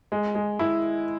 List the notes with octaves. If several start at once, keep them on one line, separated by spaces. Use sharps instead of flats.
G#3
G#3
E4